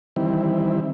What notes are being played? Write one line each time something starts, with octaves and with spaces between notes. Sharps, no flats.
D#3 E3 G3 C4 E4